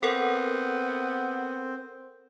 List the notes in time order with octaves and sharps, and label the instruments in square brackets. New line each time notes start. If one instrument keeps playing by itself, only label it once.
[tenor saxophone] B3 [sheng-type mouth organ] C4 [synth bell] A4 A#4 F#5